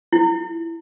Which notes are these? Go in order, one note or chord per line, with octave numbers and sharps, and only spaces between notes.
E4